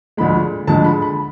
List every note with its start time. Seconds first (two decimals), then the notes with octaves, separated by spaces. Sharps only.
0.17 D2 D3 F3 G#3 B5
0.67 D2 D3 F3 G#3 A5
0.84 B5
1.02 B5